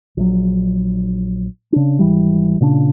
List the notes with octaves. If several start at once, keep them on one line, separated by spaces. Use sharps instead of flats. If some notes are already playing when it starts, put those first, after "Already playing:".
A#1 F#3
C#3 D4
G#1 E3 G3
A#2 C#3 C4 D4